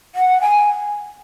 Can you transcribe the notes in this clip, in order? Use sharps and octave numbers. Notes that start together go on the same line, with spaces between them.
F#5
G#5